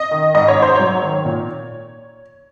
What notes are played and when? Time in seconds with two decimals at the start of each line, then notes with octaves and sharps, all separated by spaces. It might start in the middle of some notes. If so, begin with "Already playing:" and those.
Already playing: D#5
0.11 D#3
0.34 G#2 D#5
0.48 C#5
0.57 G#2
0.62 C5
0.76 F#3 C#5
1.02 D#3
1.25 A#2